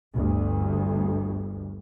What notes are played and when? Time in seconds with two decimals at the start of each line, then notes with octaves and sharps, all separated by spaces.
0.15 G1 D2